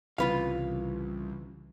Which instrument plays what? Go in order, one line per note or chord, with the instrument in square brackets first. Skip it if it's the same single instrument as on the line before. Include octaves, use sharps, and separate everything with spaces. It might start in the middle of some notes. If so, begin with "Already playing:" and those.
[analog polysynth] C2 [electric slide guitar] C#3 E3 [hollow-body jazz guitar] F4 B4 F5